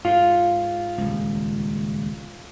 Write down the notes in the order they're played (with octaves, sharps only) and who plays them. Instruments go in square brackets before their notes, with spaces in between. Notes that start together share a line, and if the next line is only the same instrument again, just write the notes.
[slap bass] G#2 [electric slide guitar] F4
[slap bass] D#1 C#2